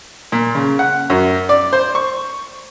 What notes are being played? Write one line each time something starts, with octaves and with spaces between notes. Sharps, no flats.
A#2
C#3
F#5
F#2
D5
C5
C#6